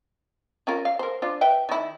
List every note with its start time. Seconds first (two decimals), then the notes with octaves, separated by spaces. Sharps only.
0.67 C#4 F4 A#4
0.85 F5
0.99 A#4 C5
1.22 D4 F4 C5
1.41 B4 E5 G5
1.69 D#3 E4